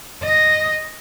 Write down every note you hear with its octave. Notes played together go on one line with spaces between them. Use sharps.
D#5